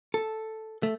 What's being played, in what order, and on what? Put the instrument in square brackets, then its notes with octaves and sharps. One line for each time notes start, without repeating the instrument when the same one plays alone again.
[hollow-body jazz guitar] A4
A3